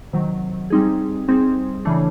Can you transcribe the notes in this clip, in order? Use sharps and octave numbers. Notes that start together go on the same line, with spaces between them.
C3 D#3 F#3
G3 C4 D#4 G#4
G3 C4 D#4 G#4
C#3 E3 A3 D4